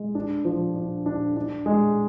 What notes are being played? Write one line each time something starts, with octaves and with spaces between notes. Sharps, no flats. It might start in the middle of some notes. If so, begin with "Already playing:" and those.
Already playing: G#3
D4
F3
D4
D4
D4
G#3